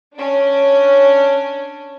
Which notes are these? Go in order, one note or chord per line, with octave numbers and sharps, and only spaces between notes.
C#4 D4